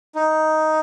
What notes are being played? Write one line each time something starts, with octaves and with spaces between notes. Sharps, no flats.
D#4